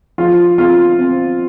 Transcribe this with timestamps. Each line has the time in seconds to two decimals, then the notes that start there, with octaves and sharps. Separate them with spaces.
0.18 F3 F4
0.58 C4 F4
0.98 C4